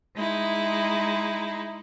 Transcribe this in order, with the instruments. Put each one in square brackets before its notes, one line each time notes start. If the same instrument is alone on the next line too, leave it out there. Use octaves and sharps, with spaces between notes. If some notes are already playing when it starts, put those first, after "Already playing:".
[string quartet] G#3 D#4 E4